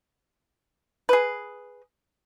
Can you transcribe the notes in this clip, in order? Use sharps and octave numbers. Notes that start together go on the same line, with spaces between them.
G#4 B4